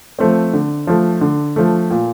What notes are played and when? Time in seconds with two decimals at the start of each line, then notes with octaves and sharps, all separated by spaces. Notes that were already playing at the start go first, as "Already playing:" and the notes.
0.19 F3 A3 C4
0.53 D3
0.87 F3 A3
1.21 D3
1.56 F3 A3
1.91 A#2